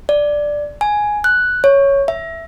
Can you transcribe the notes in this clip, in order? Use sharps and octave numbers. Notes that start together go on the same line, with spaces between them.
D5
G#5
F#6
C#5
E5